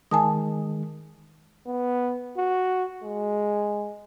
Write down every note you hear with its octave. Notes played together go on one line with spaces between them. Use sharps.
D#3 G#3 G#5 A5 D#6
B3
F#4
G#3